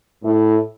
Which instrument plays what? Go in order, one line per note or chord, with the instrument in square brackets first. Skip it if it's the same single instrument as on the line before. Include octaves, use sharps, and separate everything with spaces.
[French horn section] A2